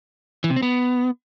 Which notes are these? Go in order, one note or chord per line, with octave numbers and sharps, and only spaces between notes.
E3
C3
C4
B3